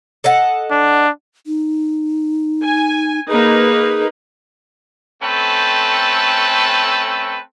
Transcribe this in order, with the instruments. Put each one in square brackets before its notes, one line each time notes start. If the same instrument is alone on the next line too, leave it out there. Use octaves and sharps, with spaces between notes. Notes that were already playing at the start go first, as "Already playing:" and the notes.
[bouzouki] A4 D#5 F#5
[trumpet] D4
[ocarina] D#4
[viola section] G#5
[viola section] A#3 D#4 B4 [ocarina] G#4
[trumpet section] A3 C4 C#4 A4 B4 G5